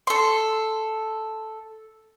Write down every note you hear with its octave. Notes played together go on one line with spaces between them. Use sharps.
A4 C6